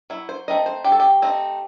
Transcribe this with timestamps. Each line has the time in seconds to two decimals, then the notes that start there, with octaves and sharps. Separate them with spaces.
0.10 F#3 E4
0.29 C5
0.48 A3 C4 D#4 D#5
0.66 C5
0.84 F#3 G4
0.92 A4
1.00 G4
1.22 A3 C4 D#4